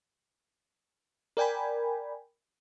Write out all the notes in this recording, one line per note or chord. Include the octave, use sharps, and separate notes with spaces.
A#4 D5 G5 G#5 B5